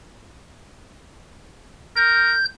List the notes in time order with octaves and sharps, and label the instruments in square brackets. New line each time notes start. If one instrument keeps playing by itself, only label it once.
[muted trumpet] A#4 [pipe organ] G6